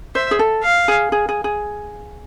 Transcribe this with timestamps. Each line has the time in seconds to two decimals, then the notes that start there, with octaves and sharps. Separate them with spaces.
0.15 C5 E5
0.31 G#4
0.39 A4
0.64 F5
0.88 G#4
1.12 G#4
1.29 G#4
1.44 G#4